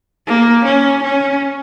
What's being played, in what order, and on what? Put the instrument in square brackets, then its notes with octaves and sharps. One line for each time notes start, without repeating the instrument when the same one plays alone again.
[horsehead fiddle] A#3
C#4
C#4